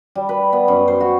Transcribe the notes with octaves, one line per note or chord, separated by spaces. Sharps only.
G3
B4
B3
F#2
C5
F#4